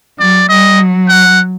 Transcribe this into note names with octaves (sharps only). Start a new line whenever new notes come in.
F#3 D5
G3 D#5
F#3
F#5